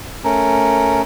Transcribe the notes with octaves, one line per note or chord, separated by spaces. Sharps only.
A3 C#4 A#4